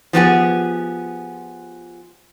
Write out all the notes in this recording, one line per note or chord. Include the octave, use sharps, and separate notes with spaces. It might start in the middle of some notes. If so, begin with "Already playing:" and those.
F3 B3 G4 G#4